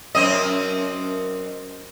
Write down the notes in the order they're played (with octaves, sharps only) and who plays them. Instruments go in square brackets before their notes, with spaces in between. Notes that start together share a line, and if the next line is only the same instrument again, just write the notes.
[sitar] F#2 C4 D#5